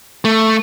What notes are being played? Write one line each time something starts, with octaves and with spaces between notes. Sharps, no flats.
A3